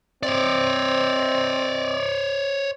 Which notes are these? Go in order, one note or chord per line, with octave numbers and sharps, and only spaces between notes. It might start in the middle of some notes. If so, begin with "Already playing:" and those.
C4 C#5 D5